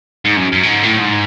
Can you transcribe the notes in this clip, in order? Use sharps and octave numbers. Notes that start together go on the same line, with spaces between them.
G#2
F#2
F#2
A2
G#2
A2
G#2